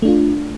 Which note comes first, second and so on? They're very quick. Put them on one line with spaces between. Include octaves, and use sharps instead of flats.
A3 D4 F4